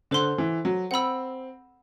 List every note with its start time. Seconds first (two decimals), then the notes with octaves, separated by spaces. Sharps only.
0.11 D3 A4 C5 F#5 C6 F#6
0.38 E3
0.65 F#3
0.91 C4 F#5 B5 E6